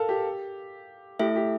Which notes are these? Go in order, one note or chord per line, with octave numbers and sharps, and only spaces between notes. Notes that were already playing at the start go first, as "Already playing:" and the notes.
Already playing: A4 A#4 F5
G4
A3 E4 G4 A4 E5
G4